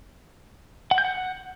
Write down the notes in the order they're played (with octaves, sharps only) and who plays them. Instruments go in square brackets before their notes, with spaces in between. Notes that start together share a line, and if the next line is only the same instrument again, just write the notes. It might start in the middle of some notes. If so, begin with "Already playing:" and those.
[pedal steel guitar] F#5
G6
F#5